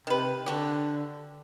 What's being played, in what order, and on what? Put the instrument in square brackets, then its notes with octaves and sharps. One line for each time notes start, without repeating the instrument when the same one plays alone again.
[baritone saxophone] C3 [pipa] D#3 B4
[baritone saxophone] D3 [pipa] D4 F#4 G4